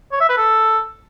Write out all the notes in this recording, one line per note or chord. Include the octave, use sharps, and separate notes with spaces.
C#5
E5
B4
A4